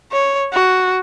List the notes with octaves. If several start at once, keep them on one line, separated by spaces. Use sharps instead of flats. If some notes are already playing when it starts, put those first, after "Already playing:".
C#5
F#4